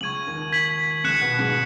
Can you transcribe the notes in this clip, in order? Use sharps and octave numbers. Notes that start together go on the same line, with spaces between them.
C#2 C#3 C#6 G#6 D#7 F#7
D#2 D#3
G#6 B6 F#7
C#2 C#3 F#6 C#7 E7
B2 B3
G#2 G#3